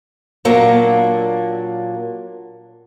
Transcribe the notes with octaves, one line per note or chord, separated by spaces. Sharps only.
A#2 F#3 A#3 D4